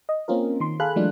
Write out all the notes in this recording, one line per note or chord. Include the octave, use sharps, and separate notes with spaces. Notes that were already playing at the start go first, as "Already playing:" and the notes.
D#5
A#3 C4 C#4 F4 A#4
D#3 C6
G#4 A4 F5 G#5 B5 F#6
E3 F#3 G#3 A3 D4 F4